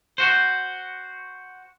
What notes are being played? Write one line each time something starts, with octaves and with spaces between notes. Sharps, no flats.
F#4 C5